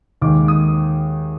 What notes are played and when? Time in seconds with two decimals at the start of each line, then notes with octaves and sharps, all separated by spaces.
0.22 D#2 D#3 G#3 D6
0.48 D#6